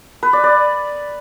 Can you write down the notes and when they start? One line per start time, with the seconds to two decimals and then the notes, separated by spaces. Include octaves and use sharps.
0.23 B4
0.33 D5
0.44 D5